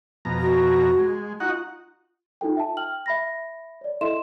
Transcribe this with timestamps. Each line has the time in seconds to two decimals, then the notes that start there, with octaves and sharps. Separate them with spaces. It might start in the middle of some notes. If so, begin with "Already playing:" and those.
0.25 F2 B2 A#5
0.39 F#4
0.98 G#3
1.40 D#4 F4 F#4 F#5
2.41 D#4 F4 A4 G5
2.57 E5 A5
2.77 G5 F6 F#7
3.06 E5 B5 A#6
3.81 C#5 D5
4.01 E4 A4 D#5 E5 C6 E7